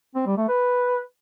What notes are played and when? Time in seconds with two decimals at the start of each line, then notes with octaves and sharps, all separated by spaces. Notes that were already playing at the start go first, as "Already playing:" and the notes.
0.15 C4
0.26 G3
0.38 A3
0.49 B4